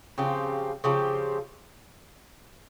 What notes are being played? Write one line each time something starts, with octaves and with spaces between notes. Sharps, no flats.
C#3 F3 C4 G4
C#3 F3 C4 G4